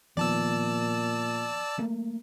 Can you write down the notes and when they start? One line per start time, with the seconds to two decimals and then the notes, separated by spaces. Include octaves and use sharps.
0.17 A#2 D#3 F3 B3 D5 A5 E6
1.78 F#3 A3 A#3